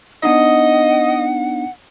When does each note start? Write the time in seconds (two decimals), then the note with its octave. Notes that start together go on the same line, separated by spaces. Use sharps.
0.23 B3 D4 D#4 D#5 F#5